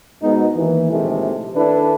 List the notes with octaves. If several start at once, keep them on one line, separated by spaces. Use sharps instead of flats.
G#2 B2 D#4
D#2 E3
A#1 D#2 A2 C3 G#3 A3
D#3 D4 E4 A4 B4